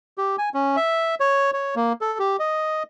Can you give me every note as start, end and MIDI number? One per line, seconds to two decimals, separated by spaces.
0.18 0.36 67
0.38 0.49 80
0.54 0.76 61
0.77 1.15 76
1.20 1.51 73
1.53 1.75 73
1.76 1.93 58
2.01 2.18 69
2.19 2.36 67
2.39 2.83 75